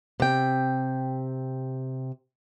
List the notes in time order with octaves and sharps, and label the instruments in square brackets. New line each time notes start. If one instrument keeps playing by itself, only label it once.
[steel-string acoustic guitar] C3 G5